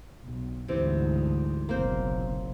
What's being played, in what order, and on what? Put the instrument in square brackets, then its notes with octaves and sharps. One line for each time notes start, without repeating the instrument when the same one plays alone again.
[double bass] B1
[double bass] D2 G#2 [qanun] C3 E3 C4
[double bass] F#1 B1 [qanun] A#3 C4 C5